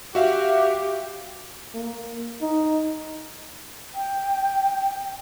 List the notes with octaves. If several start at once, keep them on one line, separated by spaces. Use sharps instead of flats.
F#4 G4 E5 F5
A#3
D#4
G5